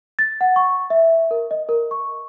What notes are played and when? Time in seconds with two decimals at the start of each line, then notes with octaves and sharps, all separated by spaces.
0.19 A6
0.41 F#5
0.56 C#6
0.90 E5
1.31 A#4
1.51 D#5
1.69 A#4
1.91 C#6